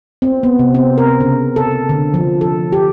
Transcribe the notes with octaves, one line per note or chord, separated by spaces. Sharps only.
C4
B3
C3
C4
A#4
C#3
A4
D3
F3
A4
G4